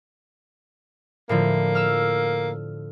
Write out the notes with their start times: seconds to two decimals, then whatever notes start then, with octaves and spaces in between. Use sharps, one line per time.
1.29 A2 D3 F3 A#3
1.75 E6 F6